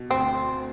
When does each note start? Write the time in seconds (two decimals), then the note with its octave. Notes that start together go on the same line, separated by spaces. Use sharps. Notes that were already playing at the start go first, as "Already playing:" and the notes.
Already playing: B2
0.10 D2 C4